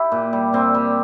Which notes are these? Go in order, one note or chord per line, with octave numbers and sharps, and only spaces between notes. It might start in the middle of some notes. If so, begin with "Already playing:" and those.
Already playing: E4 G4
A#2
G3
A#2 C4
G3